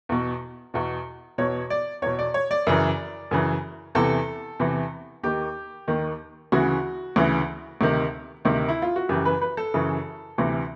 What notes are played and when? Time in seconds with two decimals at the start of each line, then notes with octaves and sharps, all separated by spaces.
0.09 E2 B2
0.74 E2 B2
1.38 E2 B2 C#5
1.70 D5
2.02 E2 B2 C#5
2.19 D5
2.34 C#5
2.51 D5
2.67 F#2 C#3 E3
3.31 F#2 C#3 E3
3.95 E2 C3 E3 A4
4.60 E2 C3 E3
5.23 D#2 D#3 G4
5.88 D#2 D#3
6.52 D2 C#3 E3 F#4
7.16 D2 C#3 E3
7.81 D2 C3 D#3
8.45 D2 C3 D#3
8.69 E4
8.82 F4
8.96 F#4
9.09 F#2 C#3 E3 G4
9.25 B4
9.42 B4
9.57 A4
9.74 F#2 C#3 E3
10.38 D2 C3 E3